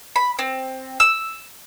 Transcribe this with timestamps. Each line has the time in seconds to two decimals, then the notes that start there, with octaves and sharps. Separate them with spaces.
0.16 B5
0.39 C4
1.00 E6